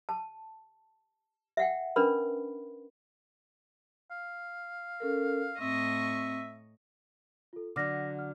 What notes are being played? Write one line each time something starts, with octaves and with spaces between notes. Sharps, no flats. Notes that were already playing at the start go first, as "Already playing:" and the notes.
A5
E5 F#5 G5
C#4 D4 A#4 B4 B5
F5
C#4 A4 A#4
A2 C4 D#5 E5 C#6
F4 A4
D3 F#3 D6 F6 A#6
F6